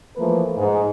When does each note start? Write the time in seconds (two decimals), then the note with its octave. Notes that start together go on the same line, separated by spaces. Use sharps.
0.16 E3 F3 A3 A#3 A#4 B4
0.57 G#2